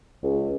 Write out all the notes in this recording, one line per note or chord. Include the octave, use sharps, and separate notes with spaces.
C#2